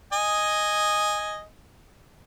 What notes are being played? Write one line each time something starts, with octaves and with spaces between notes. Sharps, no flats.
D#5 G#5